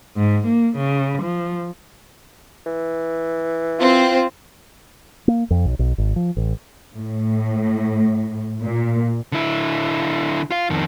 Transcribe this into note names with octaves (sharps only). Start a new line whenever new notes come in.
G#2
A#3
C#3
F3
E3
C4 F4
A#3
F2
B1
B1
G#1
F3
A1
A2
A#2
D3 E4
F4 F5
F2 D#3